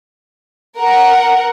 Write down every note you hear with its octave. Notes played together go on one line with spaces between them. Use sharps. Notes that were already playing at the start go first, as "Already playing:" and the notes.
A#4 F#5